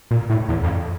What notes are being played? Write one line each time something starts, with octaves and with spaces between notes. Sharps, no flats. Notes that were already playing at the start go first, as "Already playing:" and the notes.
A#2
A2
E2
F2